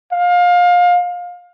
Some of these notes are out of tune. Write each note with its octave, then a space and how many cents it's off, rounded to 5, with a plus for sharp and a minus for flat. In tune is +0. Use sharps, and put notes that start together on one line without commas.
F5 +25